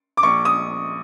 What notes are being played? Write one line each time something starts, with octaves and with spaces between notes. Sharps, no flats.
D6
A#1 C#6
D#6